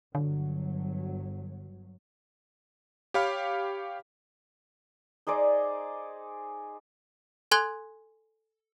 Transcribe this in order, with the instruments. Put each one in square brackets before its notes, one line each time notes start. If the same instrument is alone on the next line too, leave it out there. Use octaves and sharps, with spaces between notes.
[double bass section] G1 F#3 [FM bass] D3
[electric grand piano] G4 C#5 F5 B5 F6
[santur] D#4 G#4 C5 D5
[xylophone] A4 G#5 C6 F#6 G#6 G7